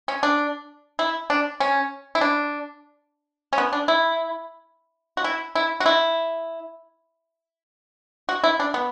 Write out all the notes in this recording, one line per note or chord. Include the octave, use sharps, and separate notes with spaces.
C#4
D4
E4
D4
C#4
E4
D4
C#4
B3
D4
E4
F#4
E4
E4
F#4
E4
F#4
E4
D4
B3